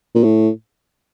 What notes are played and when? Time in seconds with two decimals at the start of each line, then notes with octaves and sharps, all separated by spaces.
0.15 A#2
0.24 A2